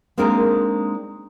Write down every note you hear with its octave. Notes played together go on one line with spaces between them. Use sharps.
G#3 A#3 C4 D4 D#4 A#4